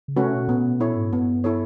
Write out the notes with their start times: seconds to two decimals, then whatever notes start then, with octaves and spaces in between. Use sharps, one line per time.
0.08 C#3
0.17 C3 A3 C#4 F#4 B4
0.35 B2
0.48 A#2 B3
0.65 B2
0.80 A#2 E4 A4 C#5
0.96 G#2
1.13 G2 B3
1.44 E4 A4 C#5